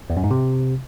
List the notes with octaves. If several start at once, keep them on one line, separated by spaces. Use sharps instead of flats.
E2
F#2
G#2
C3